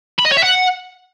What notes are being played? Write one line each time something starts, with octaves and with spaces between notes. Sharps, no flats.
B5
D#5
C#5
E5
F#5